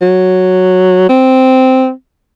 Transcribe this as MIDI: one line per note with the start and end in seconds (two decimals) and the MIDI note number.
0.02 1.06 54
1.09 1.91 60